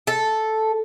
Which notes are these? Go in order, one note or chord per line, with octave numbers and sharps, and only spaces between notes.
A4